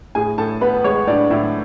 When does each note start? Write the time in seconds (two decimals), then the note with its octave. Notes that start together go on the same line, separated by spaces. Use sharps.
0.15 A2 G#4 G#5
0.38 A2 A4 A5
0.61 B3 B4 B5
0.84 G#3 C#5 C#6
1.07 A2 D4 D5
1.30 A2 E4 E5